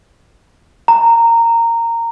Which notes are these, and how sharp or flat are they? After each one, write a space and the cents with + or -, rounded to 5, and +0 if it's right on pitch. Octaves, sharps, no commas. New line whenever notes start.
A#5 -15